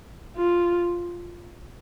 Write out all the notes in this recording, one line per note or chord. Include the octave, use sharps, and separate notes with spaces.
F4